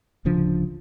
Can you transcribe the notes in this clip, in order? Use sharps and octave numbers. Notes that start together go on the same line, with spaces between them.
D1 C#3 F3 D4